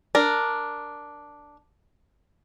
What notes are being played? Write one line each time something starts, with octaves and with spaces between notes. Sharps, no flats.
D4 A#4